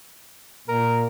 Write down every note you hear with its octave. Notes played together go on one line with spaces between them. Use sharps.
A#2 A#4